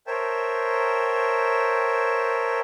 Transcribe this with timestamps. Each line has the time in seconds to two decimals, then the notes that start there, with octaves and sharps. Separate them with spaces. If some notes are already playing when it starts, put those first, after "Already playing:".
0.07 A#4 C5 C#5 E5 G5 A5